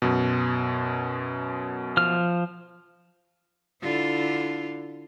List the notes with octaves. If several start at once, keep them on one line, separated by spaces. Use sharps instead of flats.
F#2 B2
F3 F6
D3 E4 F4